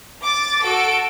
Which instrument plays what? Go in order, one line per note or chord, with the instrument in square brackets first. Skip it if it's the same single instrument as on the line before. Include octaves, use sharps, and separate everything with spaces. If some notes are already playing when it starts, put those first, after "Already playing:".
[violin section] D6 A6
F#4 A4 D7